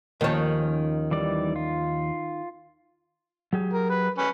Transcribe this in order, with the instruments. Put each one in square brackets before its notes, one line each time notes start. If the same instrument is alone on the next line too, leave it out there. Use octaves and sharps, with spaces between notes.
[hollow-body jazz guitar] D#2 F3 A5 [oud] D#3 C#4
[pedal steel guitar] E3 G3 D5
F4
[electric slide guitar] F#3 G4 G#4
[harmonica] A#4
B4
C#4 B4